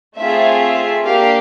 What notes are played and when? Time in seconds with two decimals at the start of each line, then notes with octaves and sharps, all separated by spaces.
0.19 A3 C4 F4 G#4 E5
0.62 E5
1.04 A#3 D4 G4 F5